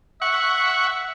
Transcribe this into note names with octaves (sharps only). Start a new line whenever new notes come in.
E5 F#5 C#6